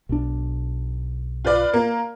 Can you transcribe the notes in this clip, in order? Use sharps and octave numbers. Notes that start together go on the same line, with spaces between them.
B1 D4
F4 B4 D5
A#3